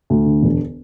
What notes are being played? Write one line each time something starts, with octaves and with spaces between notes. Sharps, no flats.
D2
D3
E1